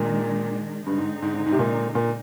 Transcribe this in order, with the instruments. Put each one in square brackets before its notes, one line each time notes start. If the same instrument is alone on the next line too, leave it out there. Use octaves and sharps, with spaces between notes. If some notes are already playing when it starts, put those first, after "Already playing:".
Already playing: [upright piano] A#2 [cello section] D#3 G#3 D4
[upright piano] G2 [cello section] D3 G#3 C4 D#4
[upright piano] G#2
G#2
G#2
G#2
C3
A#2
A#2